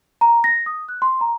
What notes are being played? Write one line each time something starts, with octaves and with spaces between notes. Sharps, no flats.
A#5
A#6
D#6
F#6
C6
A#5